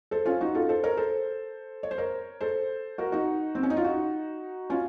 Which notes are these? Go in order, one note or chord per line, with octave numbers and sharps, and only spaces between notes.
A4 C5
C#4 F4
D#4 F#4
F4 A4
A4 C5
A#4 C#5
A4 C5
C#5
C5
A#4 C#5
A4 C5
F#4 A#4
D#4 F#4
C4
C#4
D#4
F4
D#4 F#4
C#4 F4